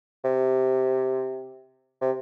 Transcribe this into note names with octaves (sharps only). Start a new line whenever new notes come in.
C3
C3